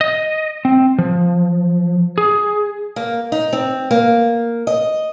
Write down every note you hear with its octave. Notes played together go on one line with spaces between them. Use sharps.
D#5
C4
F3
G#4
A#3
D#4
C4
A#3
D#5